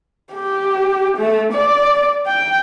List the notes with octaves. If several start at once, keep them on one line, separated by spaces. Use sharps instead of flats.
G4
A3
D5
G5